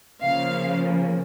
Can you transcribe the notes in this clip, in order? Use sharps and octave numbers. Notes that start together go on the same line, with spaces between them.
C#3 F3 A#3 F5